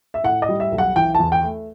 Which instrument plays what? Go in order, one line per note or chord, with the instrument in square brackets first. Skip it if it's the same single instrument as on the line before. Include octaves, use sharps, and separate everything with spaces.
[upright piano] E5
A2 F#5
D#5
G3
E5
B1
F#5
E3 G5
E2 A5
G5
A3